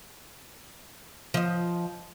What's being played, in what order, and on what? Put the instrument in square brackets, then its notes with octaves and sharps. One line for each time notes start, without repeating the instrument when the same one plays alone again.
[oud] F3 D#5